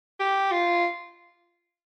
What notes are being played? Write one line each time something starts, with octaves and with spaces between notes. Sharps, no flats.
G4
F4